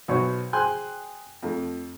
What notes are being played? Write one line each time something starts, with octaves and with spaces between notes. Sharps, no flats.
B1 B2 F#4 C5 C#5 C#6
G#4 C5 G5 G#5 C6 F#6
F2 A3